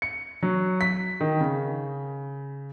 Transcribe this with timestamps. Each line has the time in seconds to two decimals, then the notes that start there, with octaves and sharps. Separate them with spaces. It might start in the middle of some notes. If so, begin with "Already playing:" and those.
0.02 C#7
0.42 F#3
0.81 B6
1.21 D#3
1.40 C#3